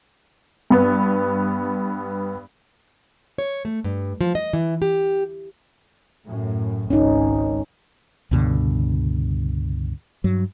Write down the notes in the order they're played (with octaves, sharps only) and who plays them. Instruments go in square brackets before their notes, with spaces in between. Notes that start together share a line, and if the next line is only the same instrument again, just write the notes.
[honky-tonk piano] G2 B3
[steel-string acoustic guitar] C#5
A3
G2
F3
D#5
E3
G4
[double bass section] F#2 A2
[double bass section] G#1 C#2 [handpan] C#4 D#4
[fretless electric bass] C#2 G2 B2 D3
G2 F#3